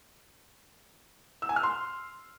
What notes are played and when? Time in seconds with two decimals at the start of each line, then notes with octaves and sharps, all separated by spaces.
1.42 E6
1.49 G#5
1.56 F6
1.63 C6